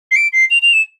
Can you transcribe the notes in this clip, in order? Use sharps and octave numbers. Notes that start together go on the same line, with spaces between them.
C7
D7
C7
F7
F7
E7